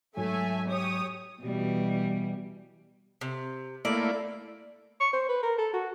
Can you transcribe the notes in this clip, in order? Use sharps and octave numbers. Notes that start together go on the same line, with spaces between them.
G#2 F#3 A3 E5 G#5
G4 C#5 D#6
B2 E3 G3
C3
A3 A#3 E4 D5
C#6
C5
B4
A#4
A4
F#4